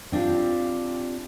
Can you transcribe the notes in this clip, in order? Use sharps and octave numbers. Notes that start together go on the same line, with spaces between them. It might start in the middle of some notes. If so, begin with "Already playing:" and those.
C4 D4 F4 G4 F5